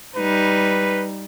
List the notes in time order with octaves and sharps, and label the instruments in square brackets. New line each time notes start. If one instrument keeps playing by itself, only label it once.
[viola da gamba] G3 D#4 [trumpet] B4